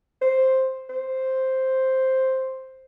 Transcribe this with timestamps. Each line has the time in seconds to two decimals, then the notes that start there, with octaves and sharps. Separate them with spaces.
0.22 C5
0.90 C5